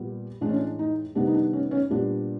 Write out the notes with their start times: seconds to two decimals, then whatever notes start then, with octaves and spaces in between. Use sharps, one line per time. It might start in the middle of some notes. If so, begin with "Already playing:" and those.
Already playing: A#2 G3 B3
0.41 A2 E3 G#3 D4
0.49 C#4
0.56 D4
0.79 D#4
1.15 C3 D#3 G3 B3 D4
1.27 D#4
1.34 D4
1.53 C#4
1.71 C#4
1.90 A#2 G3 B3 D4